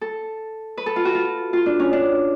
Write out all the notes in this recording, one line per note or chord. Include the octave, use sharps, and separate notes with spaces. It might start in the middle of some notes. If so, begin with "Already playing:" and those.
A4
B4
A4
F4
F#4
F4
F4
D4
C#4
D4